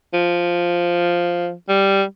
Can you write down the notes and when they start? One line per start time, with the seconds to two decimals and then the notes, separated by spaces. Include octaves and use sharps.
0.14 F3
1.69 G3